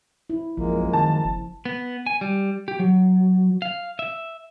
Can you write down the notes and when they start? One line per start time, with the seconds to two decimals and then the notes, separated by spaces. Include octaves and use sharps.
0.30 E4
0.57 A#1 F#2 F3 G#3 A#3
0.93 D#3 A5
1.25 F#1
1.65 B3
2.06 G#5
2.21 G3
2.68 G4
2.79 F#3
3.62 F5
3.99 E5